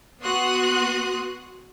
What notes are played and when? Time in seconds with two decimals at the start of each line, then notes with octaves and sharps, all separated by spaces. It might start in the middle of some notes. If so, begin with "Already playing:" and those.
0.21 B3 F#4 C6 D#6 F#6